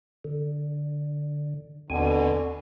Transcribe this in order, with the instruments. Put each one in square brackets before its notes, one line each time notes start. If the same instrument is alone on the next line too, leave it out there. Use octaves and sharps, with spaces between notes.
[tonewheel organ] D3
[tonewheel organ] D#2 C4 G#5 [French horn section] B2 D3